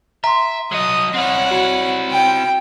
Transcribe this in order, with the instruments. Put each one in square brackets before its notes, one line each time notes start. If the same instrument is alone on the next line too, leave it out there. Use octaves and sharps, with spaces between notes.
[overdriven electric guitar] E5 [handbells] A#5 C6
[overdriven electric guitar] F#3 D#5 [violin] D#6
[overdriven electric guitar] C4 E4 [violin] C#5 F#5
[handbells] F#4
[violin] G5